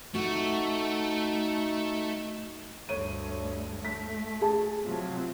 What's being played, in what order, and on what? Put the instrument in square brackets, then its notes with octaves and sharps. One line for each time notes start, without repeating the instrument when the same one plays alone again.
[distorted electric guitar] A3 [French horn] D#4 [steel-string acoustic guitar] F#4
[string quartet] D2 G2 [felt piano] C#5 D#7
[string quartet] A3 [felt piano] B6
[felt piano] G#4 A5
[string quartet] C3 F3 F#3